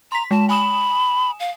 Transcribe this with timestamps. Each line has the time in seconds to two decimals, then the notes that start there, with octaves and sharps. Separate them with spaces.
0.12 A#5 C6 B6
0.31 G#3 A5
0.49 G#5 B5 D#6 E7
1.40 F5